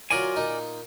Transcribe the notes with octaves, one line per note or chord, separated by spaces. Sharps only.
F#3 F4 A#4 C5 D5 G#5
A#2 D#4